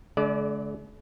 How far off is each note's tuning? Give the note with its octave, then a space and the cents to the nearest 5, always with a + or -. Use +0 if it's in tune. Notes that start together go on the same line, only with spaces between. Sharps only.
D3 -40 G#3 +45 D5 +0